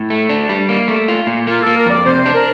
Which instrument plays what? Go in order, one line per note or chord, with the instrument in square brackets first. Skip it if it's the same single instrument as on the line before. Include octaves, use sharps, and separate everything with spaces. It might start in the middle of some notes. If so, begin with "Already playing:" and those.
Already playing: [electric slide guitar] A2
A3
D4
G3
A#3
A3
F4
A#2
[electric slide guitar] A#3 [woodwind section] F4
[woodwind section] A4
[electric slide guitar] A#3
[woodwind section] A#4
[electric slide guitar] F2 [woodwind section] D5
[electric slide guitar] C3 [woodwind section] C5
[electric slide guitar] D4
[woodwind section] A#4